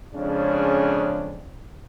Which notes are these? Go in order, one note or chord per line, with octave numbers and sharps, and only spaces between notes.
F2 C#3 G#3 C#4 D4